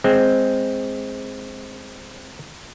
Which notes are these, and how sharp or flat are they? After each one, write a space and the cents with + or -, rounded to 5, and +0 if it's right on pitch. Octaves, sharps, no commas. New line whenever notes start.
G#3 +0 C4 +0